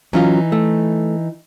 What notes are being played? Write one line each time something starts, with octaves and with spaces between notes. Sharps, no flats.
E3 F#3 C#4 D#4 F4
A3